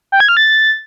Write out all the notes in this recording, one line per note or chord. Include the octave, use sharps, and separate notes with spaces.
G5
G#6
F6
A6